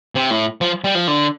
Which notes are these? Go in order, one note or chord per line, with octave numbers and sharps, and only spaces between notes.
C3
A2
F3
G3
F3
D3